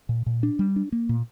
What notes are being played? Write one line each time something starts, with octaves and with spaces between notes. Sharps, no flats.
A#2
A#2
D4
G3
D4
A#3
A#2